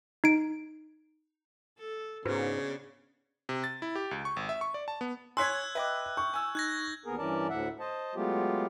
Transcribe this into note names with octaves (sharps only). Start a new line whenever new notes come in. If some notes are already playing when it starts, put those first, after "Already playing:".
D#4 D7
A4
G#2 C#3 B3 D4 F#4 B4 C5
C3
A6
E4
G4
C#2
C#6
G#1
E5
C#6
D5
A5
B3
C#5 G#5 C6 E6 F#6 G#6 B6
B4 D#5 E5 G5 D6
C#6 G6
G#5 E6
D#4 F#6 G#6 A#6
D#2 B3 G#4 A#4
G2 E3 C#4 A#4 D5 A5
D2 A2 E5 F#5
C5 D#5 A5
F#3 G#3 A3 B3 F4 G4